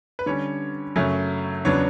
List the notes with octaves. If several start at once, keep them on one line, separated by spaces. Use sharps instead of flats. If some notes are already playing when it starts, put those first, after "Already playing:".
B4
D3 G3 C#4 C#5
F#2 C#3 F#3 A3 C#4
E2 C#3 F#3 B3 D4 C#5